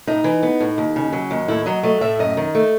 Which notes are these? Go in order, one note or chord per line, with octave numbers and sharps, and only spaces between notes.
A2 D#4
E3
B3
A2
D#2
C#3
F#3
D#2
A2 E4
F#3 D#5
A3 D#5
A2 E5
F#2 D#5
D#3
A3